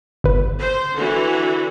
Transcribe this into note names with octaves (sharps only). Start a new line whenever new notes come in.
G1 B4
C5
D3 E3 F#4